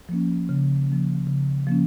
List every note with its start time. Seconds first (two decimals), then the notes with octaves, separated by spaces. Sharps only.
0.09 F3 A#3 C#4
0.49 C#3
0.88 F3 A#3 C#4
1.27 C#3
1.67 F3 A#3 C#4